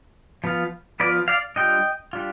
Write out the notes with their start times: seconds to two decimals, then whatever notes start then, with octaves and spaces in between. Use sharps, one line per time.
0.44 F3 B3 F4
1.00 F3 B3 F4 B4 D5
1.28 D5 F5
1.56 G3 D4 F4 D#5 G5
2.13 G3 D4 F4